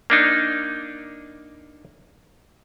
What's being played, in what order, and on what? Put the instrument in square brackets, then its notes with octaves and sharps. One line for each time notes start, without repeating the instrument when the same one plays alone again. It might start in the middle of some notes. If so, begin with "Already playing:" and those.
[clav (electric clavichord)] A#3 D4 D#4